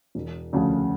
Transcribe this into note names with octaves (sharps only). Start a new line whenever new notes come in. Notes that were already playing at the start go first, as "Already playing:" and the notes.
E1
D2 C#3 F3